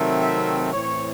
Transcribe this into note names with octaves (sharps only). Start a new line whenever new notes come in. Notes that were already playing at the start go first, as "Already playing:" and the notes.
Already playing: C3 D#3 F#3 A3 C4
E5
A2 E3 C4 C#5